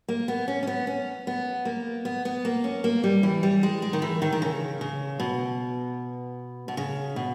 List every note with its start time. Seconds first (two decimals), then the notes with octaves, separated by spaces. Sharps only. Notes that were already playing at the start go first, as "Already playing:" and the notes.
0.09 A#3
0.28 B3
0.48 C#4
0.63 C#4
0.67 B3
0.87 C#4
1.27 B3
1.65 A#3
2.05 B3
2.25 B3
2.45 A#3
2.64 C#4
2.84 A#3
3.04 G3
3.23 E3
3.43 G3
3.63 G#3
3.82 G#3
3.93 D#3
4.02 E3
4.22 D#3
4.32 D#3
4.42 C#3
4.81 C#3
5.20 B2
6.68 B2
6.77 C#3
7.16 B2